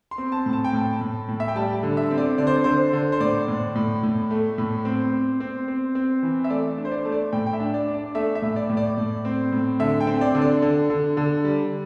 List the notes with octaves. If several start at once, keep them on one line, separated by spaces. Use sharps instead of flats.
C6
C4
A5
A2
A5
G5
A2 A5
A2
A2
E5
G5
G3 A5
D3
E5
C4
D5
D3 D5
C5
D3 C5
D3
C5
A2 D5
A2
A2
A2
A3
A2
C4
C4
C4
C4
C4
E3
E5
A3 D5
D4
C5
D5
A3
D5
A2 G5
G5
E5
D4
D5
D4
D5
A3 E5
E5
A2
D5
A2
D5
A2
C4
A2
D3 E5
G5
C4
D5
D3
D5
D3
D3
D3
G3